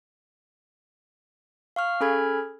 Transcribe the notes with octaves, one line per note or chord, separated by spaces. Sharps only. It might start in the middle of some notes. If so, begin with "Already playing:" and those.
F5 C#6 F6
C#4 G#4 A4 B5 F6 G#6